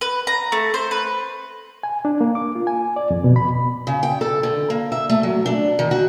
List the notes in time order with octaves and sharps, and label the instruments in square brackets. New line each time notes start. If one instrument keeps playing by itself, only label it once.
[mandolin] B4
A#5
A3
C5
B4
[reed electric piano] G#5
D4
A#3
D6
F4
G#5
D5
F2
B2
B5
[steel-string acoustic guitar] C#3
G5
A4
D3
A#3
E5
A3
F#3
D4
D#3
F#4